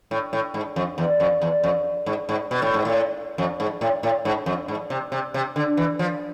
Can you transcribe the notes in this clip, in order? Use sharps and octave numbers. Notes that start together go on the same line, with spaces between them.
A2
A2
G#2
F2
E2
F2
E2
F2
G#2
G#2
B2
A2
G#2
A2
F2
G#2
A2
A2
G#2
F2
G#2
C3
C3
C3
D3
E3
F3